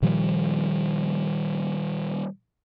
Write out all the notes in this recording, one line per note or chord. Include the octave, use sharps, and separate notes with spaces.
A#2 D#3 F3 G3